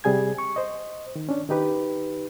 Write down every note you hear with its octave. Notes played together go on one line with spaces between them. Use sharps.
C3 G3 G#4 G#5 G#6
C#6
C5 D#5
D#3
C#4 D4
D#3 D#4 G4 B4